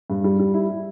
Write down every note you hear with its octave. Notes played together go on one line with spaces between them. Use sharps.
G2
G3
G3
E4
G3